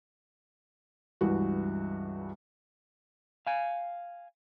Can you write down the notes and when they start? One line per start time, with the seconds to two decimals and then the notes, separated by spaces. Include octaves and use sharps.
1.21 C#2 G2 E3 F#4
3.47 F5 G#5